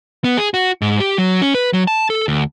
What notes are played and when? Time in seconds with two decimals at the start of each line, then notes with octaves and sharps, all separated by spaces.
0.24 B3
0.37 G#4
0.54 F#4
0.82 G#2
1.00 G4
1.18 F#3
1.42 C#4
1.54 B4
1.73 F#3
1.87 A5
2.10 A4
2.28 D2